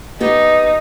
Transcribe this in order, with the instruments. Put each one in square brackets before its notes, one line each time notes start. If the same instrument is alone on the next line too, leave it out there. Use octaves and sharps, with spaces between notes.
[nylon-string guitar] B3 G4 [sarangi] D#4